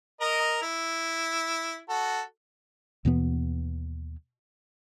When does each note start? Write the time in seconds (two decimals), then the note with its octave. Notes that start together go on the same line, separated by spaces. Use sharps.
0.21 A#4 D#5 A#5
0.62 E4
1.89 F#4 A4
3.05 D#2 B2 E3 B3